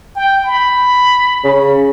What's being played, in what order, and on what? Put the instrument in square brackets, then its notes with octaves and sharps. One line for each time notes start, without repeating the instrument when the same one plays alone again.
[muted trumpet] G5
B5
[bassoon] C#3